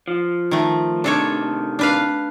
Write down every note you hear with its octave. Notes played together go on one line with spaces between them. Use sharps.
F3
D#3 A3
C3 D#3 D4 A4 C#5
D4 B4 F5